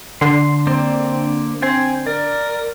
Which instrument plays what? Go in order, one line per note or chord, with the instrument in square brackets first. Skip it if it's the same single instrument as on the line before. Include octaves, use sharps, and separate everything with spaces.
[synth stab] D3 [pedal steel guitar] C6
[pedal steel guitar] A#3 C5 D5 [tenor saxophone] C4
[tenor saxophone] C4 [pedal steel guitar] G5 G#5 C6
[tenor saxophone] A#4 [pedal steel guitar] D5